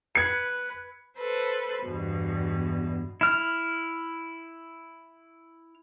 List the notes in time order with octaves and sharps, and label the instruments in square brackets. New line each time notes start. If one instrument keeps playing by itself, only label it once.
[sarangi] B4 [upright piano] G#6 C#7
[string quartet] A4 B4 C5
E2 G2 B2
[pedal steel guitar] E4 F6